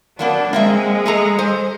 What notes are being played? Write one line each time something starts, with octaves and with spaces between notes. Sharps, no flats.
F#3 A#3 B3 D4
G#3 A#3 C4 E5
G#4 A4 A#5
C5